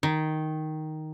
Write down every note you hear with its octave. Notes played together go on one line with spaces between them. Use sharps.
D#3